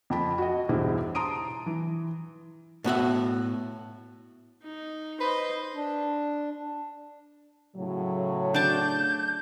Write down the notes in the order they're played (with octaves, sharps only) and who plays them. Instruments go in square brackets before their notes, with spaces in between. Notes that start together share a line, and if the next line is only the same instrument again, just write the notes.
[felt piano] F2 A5 B5
F#4 D#5
B1 E2 G2 E4 G#4 C5
A5 A#5 C6 D#6 D7 D#7
E3
[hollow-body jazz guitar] A2 B3 F#4 E5
[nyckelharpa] D#4
[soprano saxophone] B4 [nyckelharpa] C5 D#5
[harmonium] D4
[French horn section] A2 C#3 F#3
[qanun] D4 D5 A5 [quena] G6